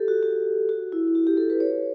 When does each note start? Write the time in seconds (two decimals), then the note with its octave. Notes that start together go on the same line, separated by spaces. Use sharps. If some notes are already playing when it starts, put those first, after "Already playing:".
Already playing: G4 A4
0.08 F#4
0.23 F#4
0.69 F#4
0.92 E4
1.08 E4
1.15 F#4
1.27 G4
1.37 A4
1.50 B4
1.60 C#5